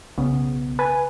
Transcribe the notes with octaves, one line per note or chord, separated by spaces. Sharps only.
B1 C#3 B3
B4 G#5